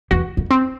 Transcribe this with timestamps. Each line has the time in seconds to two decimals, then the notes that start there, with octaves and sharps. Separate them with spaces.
0.11 E2 F#4
0.37 F2
0.51 C4